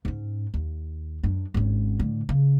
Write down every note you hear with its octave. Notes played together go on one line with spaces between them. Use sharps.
G#2 C#4
D#2
F#2 D4
G#1 C#4
A2 D3
C#3